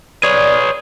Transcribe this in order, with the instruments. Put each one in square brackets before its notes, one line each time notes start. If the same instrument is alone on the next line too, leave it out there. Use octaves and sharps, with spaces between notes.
[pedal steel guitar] G#4 [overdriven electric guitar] B4 C#5 [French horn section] D5